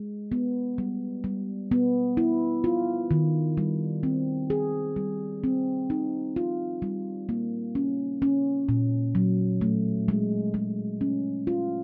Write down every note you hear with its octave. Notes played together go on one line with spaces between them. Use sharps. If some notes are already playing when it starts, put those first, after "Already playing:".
Already playing: G#3
B3
G3
G3
B3
E4
F4
D#3
G3
C4
G#4
G3
C4
D#4
F4
G3
A#3
C#4
C#4
A#2
F#3
A3
G#3
G#3
C#4
F4